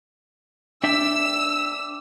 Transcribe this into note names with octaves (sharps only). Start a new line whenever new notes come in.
D4 E5 G5 E6